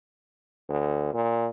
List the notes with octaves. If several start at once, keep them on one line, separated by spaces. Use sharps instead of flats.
D2
A#2